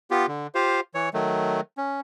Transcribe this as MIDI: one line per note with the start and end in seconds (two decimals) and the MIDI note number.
0.11 0.26 59
0.11 0.26 65
0.11 0.26 67
0.28 0.47 50
0.55 0.80 65
0.55 0.80 67
0.55 0.80 72
0.55 0.80 77
0.94 1.09 52
0.94 1.09 73
1.14 1.61 51
1.14 1.61 54
1.14 1.61 57
1.77 2.01 61